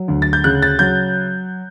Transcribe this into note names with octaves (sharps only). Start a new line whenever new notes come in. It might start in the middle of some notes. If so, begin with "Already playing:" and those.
Already playing: F#3
D2
A6
G6
C#3 F#6
A6
F#3 G6